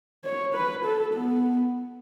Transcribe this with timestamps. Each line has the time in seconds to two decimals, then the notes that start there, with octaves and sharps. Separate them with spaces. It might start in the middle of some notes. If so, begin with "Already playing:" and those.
0.24 C#5
0.54 B4
0.85 A4
1.14 B3